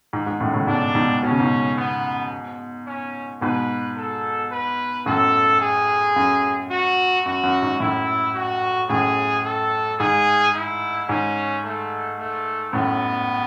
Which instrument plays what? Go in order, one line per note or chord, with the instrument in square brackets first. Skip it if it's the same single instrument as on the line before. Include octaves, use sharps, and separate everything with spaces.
[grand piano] G#2
G#2
F#2 A2
A2 C#3
[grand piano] G#2 B2 [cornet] D4
[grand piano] G#2 B2
[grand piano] B2 [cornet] C#4
[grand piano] C#3
G#2 B2
[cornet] B3
C#4
[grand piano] G#2 B2 [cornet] B4
[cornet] A4
B4
[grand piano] F#2 A2 [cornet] A4
[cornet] G#4
[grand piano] F#2
[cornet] F#4
[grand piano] F#2 [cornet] F#4
[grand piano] F#2
G#2
[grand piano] F#2 A2 [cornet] E4
[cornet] F#4
[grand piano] F#2 A2 [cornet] G#4
[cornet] A4
[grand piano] G#2 [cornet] G#4
[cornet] E4
[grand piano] G#2 [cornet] C#4
[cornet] A3
A3
[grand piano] F#2 A2 [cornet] B3